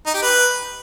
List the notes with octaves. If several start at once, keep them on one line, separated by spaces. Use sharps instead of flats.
D#4
G4
B4